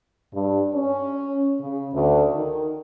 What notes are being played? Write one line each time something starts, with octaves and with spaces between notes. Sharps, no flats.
G2
C#4
C#3
D2
D#3